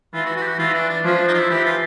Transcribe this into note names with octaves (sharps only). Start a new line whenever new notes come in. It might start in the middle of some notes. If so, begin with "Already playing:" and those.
E3 F4
F#4
F#4
G4
F#4
E3 F4
D4
D4
F3 C#4
D4
D#4
F4
E4
E3 G4
F4